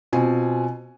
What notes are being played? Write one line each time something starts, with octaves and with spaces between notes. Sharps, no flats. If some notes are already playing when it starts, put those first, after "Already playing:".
B2 C4 F4 G#5